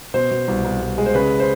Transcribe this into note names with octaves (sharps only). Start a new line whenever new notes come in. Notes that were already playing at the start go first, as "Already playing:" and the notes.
B2 C5
B2
C2
C2
C2
G#3
C5
C#3 B4
C5